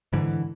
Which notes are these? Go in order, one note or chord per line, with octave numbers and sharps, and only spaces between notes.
G#2 D3 E3